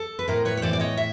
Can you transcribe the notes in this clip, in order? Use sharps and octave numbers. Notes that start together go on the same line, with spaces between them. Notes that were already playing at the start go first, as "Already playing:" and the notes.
Already playing: A4
B4
A2 A#4 C5
B4 C#5
C#5
E3 C5 D5
D5
C#5 D#5
E5